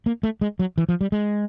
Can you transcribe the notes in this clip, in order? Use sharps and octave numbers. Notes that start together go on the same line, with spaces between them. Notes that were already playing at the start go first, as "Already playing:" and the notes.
A#3
A3
G#3
F#3
E3
F3
G3
G#3